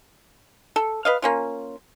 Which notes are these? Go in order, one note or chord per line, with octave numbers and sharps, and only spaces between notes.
A4
B4 D#5 F5
A#3 C#4 F4